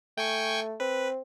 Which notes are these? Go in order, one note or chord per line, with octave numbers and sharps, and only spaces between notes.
A3 G5 G#5 C#6
C4 B4